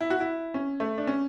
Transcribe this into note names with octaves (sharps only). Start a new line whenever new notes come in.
E4
F#4
E4
C#4
A3
D4
C#4